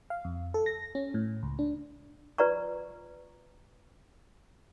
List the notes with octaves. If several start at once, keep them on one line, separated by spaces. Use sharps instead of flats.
F5
F2
A4
A#6
C#4
A2
C#2
D4
F4 B4 D5 A#5 C#6